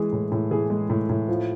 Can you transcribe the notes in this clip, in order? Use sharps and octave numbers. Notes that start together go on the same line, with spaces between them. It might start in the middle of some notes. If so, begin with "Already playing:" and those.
Already playing: E3 G#3 G#4
A2
A2
E3 G#4
G#3
A2
A2
F3